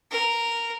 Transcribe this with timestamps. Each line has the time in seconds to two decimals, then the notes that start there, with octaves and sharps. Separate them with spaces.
0.11 A#4